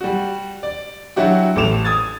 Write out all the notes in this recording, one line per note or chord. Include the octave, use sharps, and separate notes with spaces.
G3 F#4
D5
F#3 D4 E4 F#4 G4
A1 A4 D6 E7 F7
D#6 G#6 A6